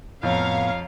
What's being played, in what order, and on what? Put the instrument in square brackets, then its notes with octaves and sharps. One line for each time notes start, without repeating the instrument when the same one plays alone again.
[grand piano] F2 [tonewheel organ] A2 B3 [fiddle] C#5 A#5 [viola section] F5